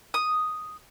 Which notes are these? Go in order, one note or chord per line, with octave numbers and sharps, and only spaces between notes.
D#6